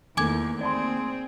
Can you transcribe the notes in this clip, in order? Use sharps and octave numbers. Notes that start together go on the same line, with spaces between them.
E2 D#3 A3 A#3 G#5 D6 G#6
C4 G#4 D5 A5 C6